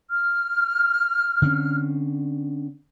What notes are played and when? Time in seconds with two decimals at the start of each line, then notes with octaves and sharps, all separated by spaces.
0.09 F6
1.42 D3 C4 C#4